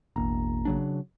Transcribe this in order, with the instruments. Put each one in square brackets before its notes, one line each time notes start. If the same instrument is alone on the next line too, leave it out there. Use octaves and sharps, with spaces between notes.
[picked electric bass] E1 [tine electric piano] A1 A#3 A#5
[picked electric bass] C#3 F#3 D4